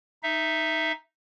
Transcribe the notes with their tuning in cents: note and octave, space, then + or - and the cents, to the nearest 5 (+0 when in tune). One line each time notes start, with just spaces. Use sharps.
D#4 +0 E5 +0